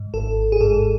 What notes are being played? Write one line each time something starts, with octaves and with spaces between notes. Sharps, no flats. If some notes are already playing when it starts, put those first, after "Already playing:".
Already playing: G#2
G#1 A4
G#4
G#2 A4